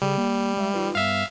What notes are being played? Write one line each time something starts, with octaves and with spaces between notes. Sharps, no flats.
C#3 G3 G#4
A#3
G#3 D5 E5
D#4 F4 B4
G2 B3 E5 F5